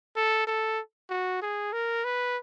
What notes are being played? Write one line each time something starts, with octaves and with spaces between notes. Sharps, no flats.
A4
A4
F#4
G#4
A#4
B4